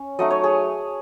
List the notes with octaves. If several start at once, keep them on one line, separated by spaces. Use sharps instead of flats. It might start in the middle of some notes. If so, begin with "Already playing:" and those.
Already playing: C#4
F#3 A3 D#4 D#5
C#5
G#4